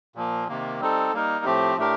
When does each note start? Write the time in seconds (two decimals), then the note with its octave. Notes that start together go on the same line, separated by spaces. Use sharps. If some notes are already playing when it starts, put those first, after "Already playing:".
0.15 A#2 F3 A#3
0.48 C3 D#3 A#3
0.80 G3 C4 D#4 A4
1.13 G3 A#3 D#4 A#4
1.45 A2 F3 A3 C4 G4
1.77 A2 A3 D4 G4 A#4